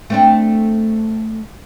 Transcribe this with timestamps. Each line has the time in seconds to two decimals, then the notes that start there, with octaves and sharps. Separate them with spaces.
0.10 A3 C4 D4